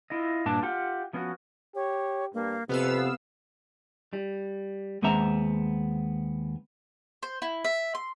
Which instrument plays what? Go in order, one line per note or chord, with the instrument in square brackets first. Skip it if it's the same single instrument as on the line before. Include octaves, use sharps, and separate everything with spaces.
[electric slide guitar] E4 F4 D#5
G2 A#2 D4 A5
F4 G4 F#5
F3 B3 C#4 F4 F#4
[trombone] G4 [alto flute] C#5
[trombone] G2 [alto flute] A#3
[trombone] F2 [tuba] C3 [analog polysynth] B3 F5 E6 [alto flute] B4
[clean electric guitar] G3
D#2 G#3 B3 C4 E5 A#5
[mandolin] C5
E4
E5
C6